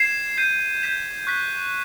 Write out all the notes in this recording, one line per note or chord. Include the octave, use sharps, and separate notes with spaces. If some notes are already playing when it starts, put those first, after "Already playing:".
Already playing: G#6 C7 E7
G6 C7 D#7
G6 B6 E7
C#6 F#6 B6